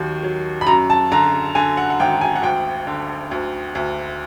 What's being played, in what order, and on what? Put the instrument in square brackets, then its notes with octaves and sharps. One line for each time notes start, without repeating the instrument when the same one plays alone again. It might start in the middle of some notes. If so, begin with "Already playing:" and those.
Already playing: [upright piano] D#2 D#3 F#3
F#3
B5
F#2 A#5
A5
D3 A#5
D3 G#5
F#5
F#5
G#1 G5
G#5
F#5
D2 G5
D3
D2
D2